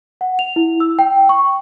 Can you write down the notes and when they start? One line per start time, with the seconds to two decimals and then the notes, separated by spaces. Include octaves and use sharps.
0.21 F#5
0.39 F7
0.56 E4
0.80 E6
0.99 G5
1.29 C#6